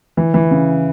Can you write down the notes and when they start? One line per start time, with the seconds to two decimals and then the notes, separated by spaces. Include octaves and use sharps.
0.17 E3
0.34 E3
0.51 C#3